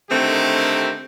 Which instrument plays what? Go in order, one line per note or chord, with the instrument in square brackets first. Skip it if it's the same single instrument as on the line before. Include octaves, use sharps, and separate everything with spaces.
[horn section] D3 D#3 A3 C4 G4 A#4